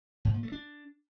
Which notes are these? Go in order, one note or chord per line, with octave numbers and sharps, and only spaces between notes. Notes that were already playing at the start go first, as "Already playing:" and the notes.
G#2
A#2
A3
D4